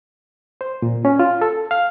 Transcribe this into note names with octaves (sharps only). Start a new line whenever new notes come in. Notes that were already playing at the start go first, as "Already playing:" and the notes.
C5
A#2
C#4
F4
A4
F5